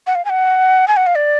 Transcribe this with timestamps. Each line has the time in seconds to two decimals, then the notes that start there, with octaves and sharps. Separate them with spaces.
0.07 F#5
0.15 F5
0.25 G#5
0.30 F#5
0.88 G#5
0.97 F#5
1.06 F5
1.15 D5